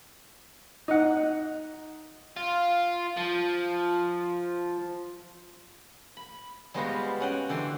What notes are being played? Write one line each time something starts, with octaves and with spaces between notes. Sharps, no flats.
D#4 F#5
F4
F3
B5
G3 G#3 B3 F4 F#4 C5
C#4 F#5 G5
D3 E3 G5 C6